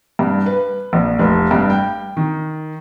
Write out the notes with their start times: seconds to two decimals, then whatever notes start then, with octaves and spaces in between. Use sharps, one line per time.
0.19 G2
0.46 B4
0.93 A#1
1.19 F1
1.51 G2
1.70 G5
2.17 D#3